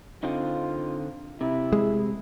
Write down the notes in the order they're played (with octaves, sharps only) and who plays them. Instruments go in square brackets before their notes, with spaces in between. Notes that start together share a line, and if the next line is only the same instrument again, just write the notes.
[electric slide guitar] D3 C4 D#4 [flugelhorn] F4
[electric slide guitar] C3 [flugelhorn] E4
[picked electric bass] G#3